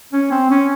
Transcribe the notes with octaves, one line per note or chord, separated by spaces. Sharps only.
C#4
C4
C#4